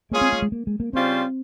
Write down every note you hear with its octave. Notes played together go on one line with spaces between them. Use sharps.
G#3 A#3 C#4 F4 G#4
C4
A#3
G#3
A#3
G#3
A#3
C#3 G3 C4 C#4 F4 C5